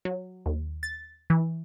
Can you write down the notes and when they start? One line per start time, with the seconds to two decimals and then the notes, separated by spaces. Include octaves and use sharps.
0.05 F#3
0.46 D#2
0.83 A6
1.30 E3